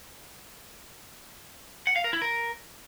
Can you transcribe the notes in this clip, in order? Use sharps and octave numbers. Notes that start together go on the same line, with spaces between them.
F#5
F5
A#4
E4
A#4